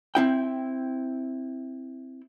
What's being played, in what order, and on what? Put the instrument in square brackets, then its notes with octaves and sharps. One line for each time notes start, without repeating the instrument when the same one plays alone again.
[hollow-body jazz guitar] C4 E4 G5